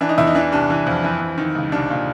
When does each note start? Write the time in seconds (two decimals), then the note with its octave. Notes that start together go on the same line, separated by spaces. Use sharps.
0.01 E3 D4
0.09 D#4
0.18 E2 E4
0.27 D#4
0.35 E3 D4
0.52 C2 D4
0.70 E3
0.86 F2
1.04 E3
1.21 F2
1.38 D#3
1.55 C#2
1.72 C2 D4
1.90 A#2